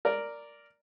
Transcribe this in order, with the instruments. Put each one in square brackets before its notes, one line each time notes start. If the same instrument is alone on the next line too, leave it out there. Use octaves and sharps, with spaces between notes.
[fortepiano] A#4 D5